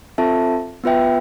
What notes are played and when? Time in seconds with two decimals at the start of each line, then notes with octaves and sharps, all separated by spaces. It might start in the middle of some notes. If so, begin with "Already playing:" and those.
0.18 C4 F4 A4 E5 A5
0.84 B3 F4 B4 E5 G5